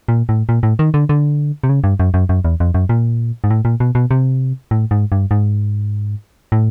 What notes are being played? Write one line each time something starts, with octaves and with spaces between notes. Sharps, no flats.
A#2
A2
A#2
A2
D#3
D3
D3
C3
C#3
G2
F#2
F#2
F#2
E2
F2
F#2
A#2
G#2
A2
A#2
B2
B2
C3
A2
G#2
G2
G#2
A2